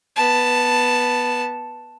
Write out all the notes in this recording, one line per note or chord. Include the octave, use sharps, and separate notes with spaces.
B3 A5